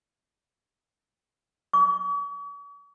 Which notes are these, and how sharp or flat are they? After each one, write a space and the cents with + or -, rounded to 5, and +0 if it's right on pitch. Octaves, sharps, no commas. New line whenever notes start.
C#6 +45